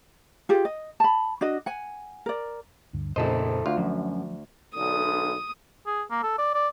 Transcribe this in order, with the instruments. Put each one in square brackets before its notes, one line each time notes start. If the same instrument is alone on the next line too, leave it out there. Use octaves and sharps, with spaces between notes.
[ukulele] F4 G4 G#4
D#5
A5 B5
D4 F#4 D#5
F#5 G#5
A#4 D5
[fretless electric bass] D2 G2 D3
[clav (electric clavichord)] A#1 D#5 [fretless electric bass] F2 A#2 C#3 [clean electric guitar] E4 A4 C5
[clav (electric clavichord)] D2 [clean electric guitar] F4
[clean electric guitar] F#2 [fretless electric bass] F3 F#3
[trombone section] B1 D3 [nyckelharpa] D#6
[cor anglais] G#4
A#3
A4
D5
D5